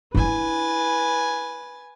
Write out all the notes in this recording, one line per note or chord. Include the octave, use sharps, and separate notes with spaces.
D4 E4 B4 G#5 A6